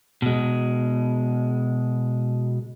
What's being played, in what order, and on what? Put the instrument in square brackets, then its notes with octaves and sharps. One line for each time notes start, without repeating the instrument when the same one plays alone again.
[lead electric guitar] B2 G#3